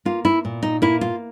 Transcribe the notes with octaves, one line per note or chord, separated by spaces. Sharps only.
A#3 F4
E4
A#2
D#4
A#3 E4
F4